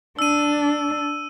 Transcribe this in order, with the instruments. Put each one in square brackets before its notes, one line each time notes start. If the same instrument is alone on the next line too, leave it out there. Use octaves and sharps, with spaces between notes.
[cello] D4 [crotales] E6 D#7